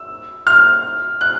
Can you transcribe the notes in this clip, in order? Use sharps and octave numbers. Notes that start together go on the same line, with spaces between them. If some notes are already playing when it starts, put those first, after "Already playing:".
Already playing: E6
F6
F#6